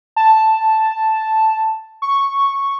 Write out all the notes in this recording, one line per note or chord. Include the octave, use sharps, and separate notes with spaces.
A5
C#6